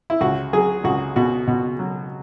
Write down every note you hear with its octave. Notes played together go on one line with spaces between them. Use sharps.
E4
C#2 F#4
F#3 G#4
C#2 F#4
B2 F#4
B2
F#3